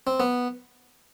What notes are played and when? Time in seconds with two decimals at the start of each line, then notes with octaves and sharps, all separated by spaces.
0.07 C4
0.20 B3